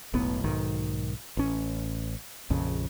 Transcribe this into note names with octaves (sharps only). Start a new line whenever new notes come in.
E1 B1 A2 B3
B1 G#2 D#3
A1 C#4
A#1 F2 C#3